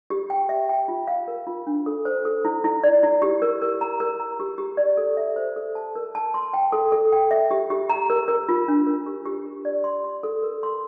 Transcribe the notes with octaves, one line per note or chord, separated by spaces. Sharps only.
G4
G5
E5
G5
F4
F5
A#4
F4
D4
A4
C5
A4
E4
E4
D5
E4
G4
A#4
A#4
A#5
A#4
A#5
G4
G4
D5
A4
E5
C5
A4
A5
A#4
A5
C6
G5
A4
A4
G5
E5
G4
G4
A#5
A#4
A#4
F4
D4
A#4
G4
G4
A#4
D5
C6
C6
A4
A#4
C6